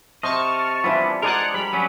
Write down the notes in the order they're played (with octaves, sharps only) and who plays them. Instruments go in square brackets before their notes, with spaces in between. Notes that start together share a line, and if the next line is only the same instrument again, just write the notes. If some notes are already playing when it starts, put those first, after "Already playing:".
[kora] C3 C5 [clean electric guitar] D#5 [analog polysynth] A5 C#6 F6
[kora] E3 F3 G3 [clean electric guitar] B3 [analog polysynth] D4 E4
[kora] G#3 D4 [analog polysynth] G#4 D5 F#5 [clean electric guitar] A#4
[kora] G3 [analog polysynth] B5
[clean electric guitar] F#3 B3 C#4